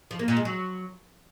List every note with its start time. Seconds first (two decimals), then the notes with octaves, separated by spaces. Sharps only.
0.11 F3
0.19 A#3
0.28 A#2
0.37 G#3
0.45 F#3